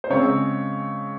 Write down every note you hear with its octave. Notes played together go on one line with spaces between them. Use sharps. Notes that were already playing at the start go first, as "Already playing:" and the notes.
C5
C#3 G#3 C4 C#5